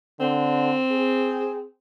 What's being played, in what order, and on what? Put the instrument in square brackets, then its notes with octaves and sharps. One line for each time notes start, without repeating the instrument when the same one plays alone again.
[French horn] D3 [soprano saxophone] C4
[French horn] G#4